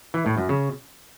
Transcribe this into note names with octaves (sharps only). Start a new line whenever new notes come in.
E3
A2
F#2
C#3